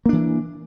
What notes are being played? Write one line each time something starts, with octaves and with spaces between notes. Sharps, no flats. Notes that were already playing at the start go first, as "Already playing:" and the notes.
E3 A#3 D4